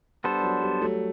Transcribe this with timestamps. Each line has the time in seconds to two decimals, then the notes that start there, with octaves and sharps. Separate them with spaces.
0.24 G3 B3 D4 A4 C5
0.43 F#3
0.62 G3
0.81 F#3 A3